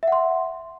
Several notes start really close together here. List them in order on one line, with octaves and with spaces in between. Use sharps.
E5 F#5 C6